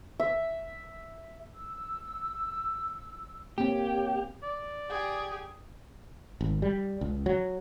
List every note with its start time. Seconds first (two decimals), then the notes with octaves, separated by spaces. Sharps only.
0.20 E5
1.54 E6
3.58 A#3 C4 G4 C#5
4.43 D5
4.89 G4 G#4
6.41 G#1
6.62 G3
7.01 C#2
7.26 F#3